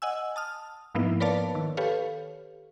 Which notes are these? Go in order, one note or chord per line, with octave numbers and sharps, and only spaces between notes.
D#5 F#5 G#5 E6
A5 D#6 F6
G#2 F3 A#3 B3 D#4 E4
A#4 B4 C#5 D5 F5 A5
D#3
G4 A4 B4 C#5 F5